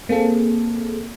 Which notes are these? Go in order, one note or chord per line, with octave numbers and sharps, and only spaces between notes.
A#3 C4 G#4 A4